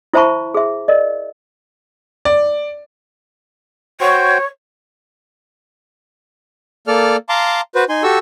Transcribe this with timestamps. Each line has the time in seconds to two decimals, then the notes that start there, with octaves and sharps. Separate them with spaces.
0.14 E4 C5 E5 A5 B5 C#6
0.54 G#4 E5
0.88 A#4 D5 D#5
2.25 D5
4.01 F#4 C5 C#5 G5
6.87 A#3 A4 D5 F6
7.29 F5 A5 A#5 C6 D6
7.75 F#4 B4 C5
7.89 D#4 G#5 C6
8.03 F#4 G4 A4 C#6 E6